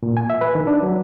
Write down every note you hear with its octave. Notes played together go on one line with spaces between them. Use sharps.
A#2
G#5
E5
B4
D#3
D4
F#3